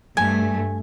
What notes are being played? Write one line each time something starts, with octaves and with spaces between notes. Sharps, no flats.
G2 A3 G#5